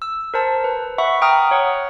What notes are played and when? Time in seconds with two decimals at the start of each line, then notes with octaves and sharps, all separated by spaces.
0.02 E6
0.34 A#4 C5 A5
0.64 B4
0.98 E5 F#5 B5 C#6
1.22 G5 A#5 D#6 F6
1.51 C#5 F#5